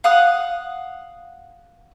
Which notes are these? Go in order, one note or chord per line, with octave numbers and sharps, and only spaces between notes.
F5 F#5 D#6 F#6